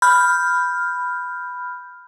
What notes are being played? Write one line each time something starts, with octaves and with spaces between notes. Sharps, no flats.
B5 F6 G6